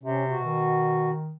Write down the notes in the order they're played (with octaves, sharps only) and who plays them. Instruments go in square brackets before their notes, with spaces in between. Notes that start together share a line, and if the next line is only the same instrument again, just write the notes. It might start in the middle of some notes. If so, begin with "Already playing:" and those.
[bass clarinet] C3 [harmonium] C#4
[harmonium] B2 F#4
[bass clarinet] D#3